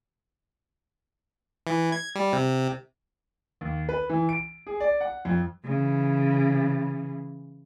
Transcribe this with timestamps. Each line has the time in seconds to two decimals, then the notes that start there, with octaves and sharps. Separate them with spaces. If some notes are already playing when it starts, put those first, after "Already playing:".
1.67 E3
1.92 G#6
2.15 G3
2.33 C3
3.61 D#2
3.89 B4
4.09 E3
4.29 D7
4.67 G#4
4.80 D5
5.01 F#5
5.25 F2
5.65 C#3 E3